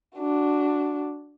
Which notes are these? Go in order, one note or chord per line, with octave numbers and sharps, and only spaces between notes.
D4 F#4